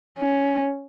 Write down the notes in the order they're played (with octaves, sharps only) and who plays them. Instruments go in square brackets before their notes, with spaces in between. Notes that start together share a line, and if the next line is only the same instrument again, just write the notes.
[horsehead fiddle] C#4